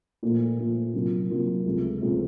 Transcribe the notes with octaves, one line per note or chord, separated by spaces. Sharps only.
A#2 F3 A3
A#2 F3 A3
C3 F#3 A#3 F4
C3 F#3 A#3 F4
C#2 C3 F3 A3
C#2 C3 F3 A3